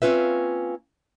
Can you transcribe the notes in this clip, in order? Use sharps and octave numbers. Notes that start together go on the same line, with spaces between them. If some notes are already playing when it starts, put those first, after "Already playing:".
A#3 C4 C#4 F4 B4 E5